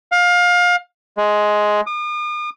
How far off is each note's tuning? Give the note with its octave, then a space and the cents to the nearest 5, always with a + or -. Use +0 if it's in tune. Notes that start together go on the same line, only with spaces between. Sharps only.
F5 +25
G#3 +10
D#6 -45